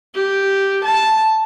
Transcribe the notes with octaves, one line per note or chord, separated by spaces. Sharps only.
G4
A5